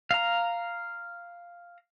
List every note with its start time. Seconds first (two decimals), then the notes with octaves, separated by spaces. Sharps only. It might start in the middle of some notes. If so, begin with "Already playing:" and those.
0.11 F5 A#5